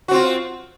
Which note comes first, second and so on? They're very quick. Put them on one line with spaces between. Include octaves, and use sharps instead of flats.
F#4 C4 F4